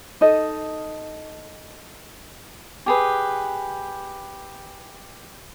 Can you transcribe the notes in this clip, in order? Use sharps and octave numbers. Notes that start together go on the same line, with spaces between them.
D#4 A4 D#5
G4 G#4 B4